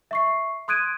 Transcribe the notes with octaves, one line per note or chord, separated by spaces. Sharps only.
E5 C#6 C7
C6 D#6 F#6 G#6 D7 D#7